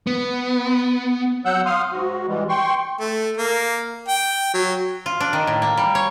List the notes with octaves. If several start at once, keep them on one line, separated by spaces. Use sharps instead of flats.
B3
F#3 F#5 E6 F#6 G6
F5 C6 D#6 F6
G#2 F#4
E3 G3 G#3
G5 C6 C#6
A3
A#3
G5
F#3
F4
D4
D#3
A2
A#3
G3
C#5